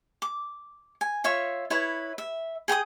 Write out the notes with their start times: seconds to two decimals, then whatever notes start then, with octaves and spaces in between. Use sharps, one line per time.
0.22 D6
1.01 G#5
1.24 F4 C#5 E5 C#6
1.70 E4 B4 C#5 C#6
2.18 E5
2.68 G#4 G5 A#5 D#6